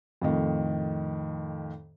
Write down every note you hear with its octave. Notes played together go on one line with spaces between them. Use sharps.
F2 A2 D#3